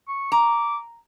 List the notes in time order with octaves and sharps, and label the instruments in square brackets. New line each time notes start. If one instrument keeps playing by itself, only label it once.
[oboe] C#6
[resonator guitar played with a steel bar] A#5 [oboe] D6